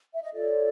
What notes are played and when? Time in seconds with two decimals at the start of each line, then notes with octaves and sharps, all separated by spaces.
0.13 E5
0.23 D#5
0.33 F4 A4 C#5 D5